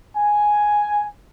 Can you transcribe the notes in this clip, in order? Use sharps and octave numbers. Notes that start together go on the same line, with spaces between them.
G#5